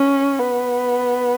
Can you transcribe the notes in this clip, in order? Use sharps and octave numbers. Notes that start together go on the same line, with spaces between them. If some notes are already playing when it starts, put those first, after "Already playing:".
Already playing: C#4
B3